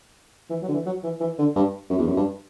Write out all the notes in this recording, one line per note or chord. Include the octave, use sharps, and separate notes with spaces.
E3
F#3
D3
E3
F#3
E3
E3
D3
G2
F#2
E2
F#2
G2